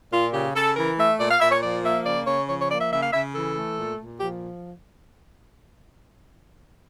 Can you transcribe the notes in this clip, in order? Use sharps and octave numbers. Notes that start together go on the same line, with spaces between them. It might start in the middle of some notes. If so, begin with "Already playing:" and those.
A#2 F4
C#3 G4
C#3 A4
E3 A#4
A3 E5
A#2 D5
F5
A#2 E5
C#5
F3 D5
A#3 E5
C#3 D5
C#3 C#5
F3 C#5
C#5
A#3 D5
E5
C#3 E5
F5
C#3 E5
E3 A4
A3
A#2
A#2
F3 G4